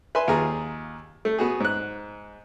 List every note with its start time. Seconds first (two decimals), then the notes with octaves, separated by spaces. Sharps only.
0.15 B4 E5 G#5 C6
0.28 D#2 F4 G#4 A#5
1.25 A3
1.38 B3 F#4 G#4
1.60 G#2 F#6